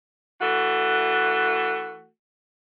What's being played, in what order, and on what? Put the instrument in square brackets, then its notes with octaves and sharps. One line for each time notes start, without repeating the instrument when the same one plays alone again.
[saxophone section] E3 A3 F#4